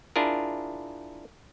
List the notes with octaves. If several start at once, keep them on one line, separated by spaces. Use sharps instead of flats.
D4 E4 F4 G#4 A#4